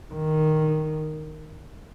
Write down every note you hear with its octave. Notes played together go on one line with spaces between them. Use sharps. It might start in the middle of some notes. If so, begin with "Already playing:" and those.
D#3